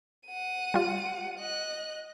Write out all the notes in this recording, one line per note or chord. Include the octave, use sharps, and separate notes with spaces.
F#5 D#7
G3 F4
D#5 F#6